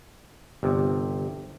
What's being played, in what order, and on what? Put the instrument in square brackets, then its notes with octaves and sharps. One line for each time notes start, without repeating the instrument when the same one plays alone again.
[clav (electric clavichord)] G1 C3